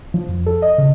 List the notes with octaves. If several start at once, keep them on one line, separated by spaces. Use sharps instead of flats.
F3
F2
A4
D#5
C#3